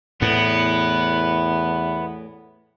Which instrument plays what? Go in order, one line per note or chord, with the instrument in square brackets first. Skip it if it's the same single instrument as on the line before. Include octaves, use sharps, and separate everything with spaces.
[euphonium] E2 [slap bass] A2 [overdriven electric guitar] B3